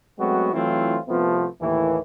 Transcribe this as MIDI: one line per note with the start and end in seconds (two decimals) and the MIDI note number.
0.18 0.52 54
0.18 0.52 56
0.18 0.52 57
0.18 0.52 59
0.18 0.52 60
0.18 0.52 66
0.53 0.98 52
0.53 0.98 54
0.53 0.98 57
0.53 0.98 60
0.53 0.98 64
0.53 0.98 65
1.08 1.46 36
1.08 1.46 48
1.08 1.46 53
1.08 1.46 57
1.08 1.46 59
1.60 1.98 39
1.60 1.98 45
1.60 1.98 52